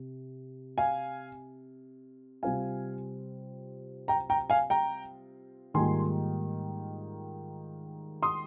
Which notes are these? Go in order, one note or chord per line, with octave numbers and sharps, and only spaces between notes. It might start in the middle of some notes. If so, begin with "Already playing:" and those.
Already playing: C3
F5 G#5
C3 G3 C4 F4 F5 G#5
G5 A#5
G5 A#5
F5 G#5
G5 A#5
G#2 D#3 G3 A#3 F4 G#5 C6
C6 D#6